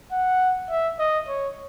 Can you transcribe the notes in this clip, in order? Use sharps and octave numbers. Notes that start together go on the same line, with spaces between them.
F#5
E5
D#5
C#5